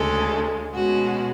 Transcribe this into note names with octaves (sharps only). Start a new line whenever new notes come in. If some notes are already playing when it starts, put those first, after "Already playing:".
Already playing: D2 C#3 G#3 A4
B2 G#3 C#4 F#4